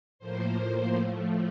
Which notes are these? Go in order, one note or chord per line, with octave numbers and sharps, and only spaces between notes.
A2 F3 A#3 C5
A2 F3 A3